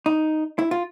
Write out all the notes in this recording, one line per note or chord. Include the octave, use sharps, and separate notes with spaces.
D#4
E4
F4